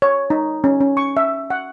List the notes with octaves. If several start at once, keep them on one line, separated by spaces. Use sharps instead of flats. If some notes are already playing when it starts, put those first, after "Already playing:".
C#5
D#4
C#4
C#4
C#6
E5
F#5